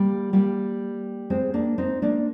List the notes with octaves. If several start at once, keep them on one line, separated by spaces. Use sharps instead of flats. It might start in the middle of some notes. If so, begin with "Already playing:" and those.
Already playing: G3 A#3
G3 A#3
G#3 C4
A#3 D4
C4 D#4
A#3 D4